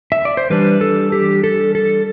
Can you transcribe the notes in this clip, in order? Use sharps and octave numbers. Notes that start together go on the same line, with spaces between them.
E5
D5
C5
E3 G3 D4 B4
A4
G4
A4
A4